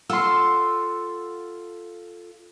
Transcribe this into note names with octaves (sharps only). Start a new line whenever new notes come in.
F4 A4 F#5 C6 E6